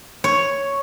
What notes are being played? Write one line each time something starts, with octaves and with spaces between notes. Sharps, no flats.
C#5